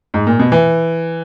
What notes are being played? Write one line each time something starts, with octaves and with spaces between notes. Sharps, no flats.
G#2
A#2
B2
E3